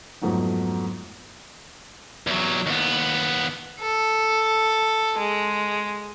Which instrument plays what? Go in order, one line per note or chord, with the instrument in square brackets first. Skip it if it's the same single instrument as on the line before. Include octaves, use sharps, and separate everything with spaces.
[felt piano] F2 G#2 F#3 A3 B3 D#4
[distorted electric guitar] E2 F#3
D#2 B3
[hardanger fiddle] A4
G#3